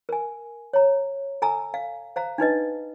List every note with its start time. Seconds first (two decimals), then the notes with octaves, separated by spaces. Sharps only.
0.09 A#4 G#5
0.73 C#5 A#5
1.42 A4 G#5 A#5 E6
1.74 F5
2.16 C5 F5 A#5
2.38 D4 D#4 B4 D#5